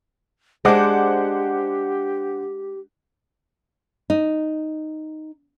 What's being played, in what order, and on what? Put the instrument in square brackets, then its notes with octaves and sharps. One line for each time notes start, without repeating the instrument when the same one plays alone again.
[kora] G#3 D4 [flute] G4 [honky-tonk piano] C5 F#5 D6
[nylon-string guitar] D#4